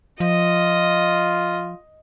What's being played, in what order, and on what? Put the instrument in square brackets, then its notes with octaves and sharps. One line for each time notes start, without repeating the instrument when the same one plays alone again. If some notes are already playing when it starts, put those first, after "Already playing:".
[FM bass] F3 [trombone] F4 [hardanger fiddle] D#5